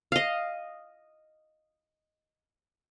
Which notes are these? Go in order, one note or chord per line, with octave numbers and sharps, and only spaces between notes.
D#5 F5